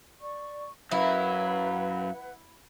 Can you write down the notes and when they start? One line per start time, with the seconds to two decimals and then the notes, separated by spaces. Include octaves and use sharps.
0.20 D5 C#6
0.91 F#2 F#3 E4 B4 F5 F#5